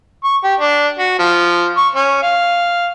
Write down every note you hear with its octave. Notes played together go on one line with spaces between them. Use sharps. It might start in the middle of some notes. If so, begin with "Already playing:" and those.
C#6
G4
D4
F#4
F3
C#6
C#4
F5